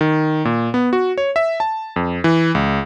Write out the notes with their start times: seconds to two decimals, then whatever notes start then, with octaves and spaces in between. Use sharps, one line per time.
0.01 D#3
0.45 A#2
0.74 B3
0.93 F#4
1.18 C#5
1.36 E5
1.60 A5
1.96 F2
2.24 E3
2.55 C#2